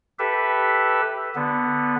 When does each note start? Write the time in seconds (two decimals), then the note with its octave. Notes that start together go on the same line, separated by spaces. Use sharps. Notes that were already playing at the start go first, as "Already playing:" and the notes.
0.19 G4 A4 B4 E5
1.35 D3 B3